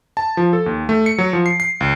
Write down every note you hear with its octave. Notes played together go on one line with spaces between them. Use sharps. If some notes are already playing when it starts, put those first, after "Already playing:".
A5
F3
A4
D#2
A3
C#7
F#3
F3
C7
C7
C#2